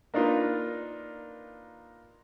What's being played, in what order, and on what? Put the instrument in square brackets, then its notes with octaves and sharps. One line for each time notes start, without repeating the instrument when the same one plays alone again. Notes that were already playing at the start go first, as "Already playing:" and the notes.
[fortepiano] A#3 D4 D#4 F4 A#4 B4